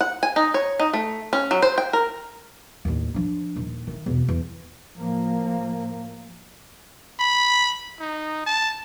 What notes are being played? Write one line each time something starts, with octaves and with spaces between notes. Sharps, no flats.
F#5
G#5
D#4
C#5
D#4
A3
C#4
F#3
C5
G5
A#4
A1 D#2
F3 D4
D#1
D#3 A3
E2 B2
E2
A2 F3 A#3
B5
D#4
A5